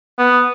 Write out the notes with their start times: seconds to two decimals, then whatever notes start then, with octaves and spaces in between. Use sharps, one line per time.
0.18 B3